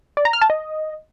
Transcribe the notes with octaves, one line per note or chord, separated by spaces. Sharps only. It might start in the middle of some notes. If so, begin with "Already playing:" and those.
D5
A#5
F6
A5
D#5